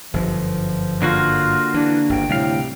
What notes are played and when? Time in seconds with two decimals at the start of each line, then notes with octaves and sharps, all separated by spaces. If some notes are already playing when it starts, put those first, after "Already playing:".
0.14 G1 F#2 F3
1.02 D3 A#3 F4 F#4
1.74 E3 D4
2.09 G1 G#2 G5
2.30 D2 A2 C3 G3 F5